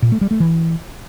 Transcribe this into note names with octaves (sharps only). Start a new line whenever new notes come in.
A#2
A3
G3
A3
E3